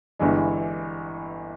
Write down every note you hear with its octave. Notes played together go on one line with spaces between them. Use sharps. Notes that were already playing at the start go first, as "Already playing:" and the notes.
G1 G2 E3 G#3